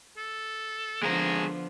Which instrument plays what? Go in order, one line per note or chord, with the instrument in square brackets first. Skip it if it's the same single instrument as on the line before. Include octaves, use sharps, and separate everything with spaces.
[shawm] A4
[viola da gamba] D3 F3 B3 [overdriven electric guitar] G#3 A#4 [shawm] G#4